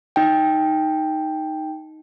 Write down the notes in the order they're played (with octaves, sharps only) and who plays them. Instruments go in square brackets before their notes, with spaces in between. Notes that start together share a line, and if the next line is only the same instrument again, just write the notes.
[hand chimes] D#4 G5